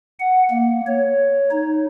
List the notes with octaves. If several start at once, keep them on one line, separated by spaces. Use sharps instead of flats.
F#5
A#3
C#5
D#4